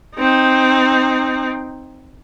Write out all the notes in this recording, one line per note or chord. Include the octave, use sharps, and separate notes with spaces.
C4 D#4